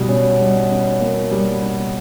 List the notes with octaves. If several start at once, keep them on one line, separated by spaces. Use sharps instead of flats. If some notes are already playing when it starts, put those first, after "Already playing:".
Already playing: B2 G3
C#4
G3
C#4
A#3
G3
C#4